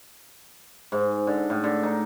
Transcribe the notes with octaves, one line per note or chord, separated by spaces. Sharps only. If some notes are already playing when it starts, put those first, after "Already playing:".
G#2
D3
A2
D3
D#4